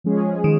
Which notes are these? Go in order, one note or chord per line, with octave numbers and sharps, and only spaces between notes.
F3 G#3 C#4 G#4
D#3